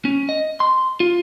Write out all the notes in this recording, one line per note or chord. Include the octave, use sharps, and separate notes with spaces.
C#4
D#5
C6
F4